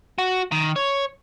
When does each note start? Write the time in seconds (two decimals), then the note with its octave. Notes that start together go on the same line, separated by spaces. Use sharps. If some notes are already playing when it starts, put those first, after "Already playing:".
0.18 F#4
0.52 D#3
0.76 C#5